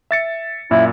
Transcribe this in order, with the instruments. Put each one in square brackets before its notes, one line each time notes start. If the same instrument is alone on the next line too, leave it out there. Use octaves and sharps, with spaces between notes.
[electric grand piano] E5 A6 C#7
[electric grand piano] F#2 A#2 [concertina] E4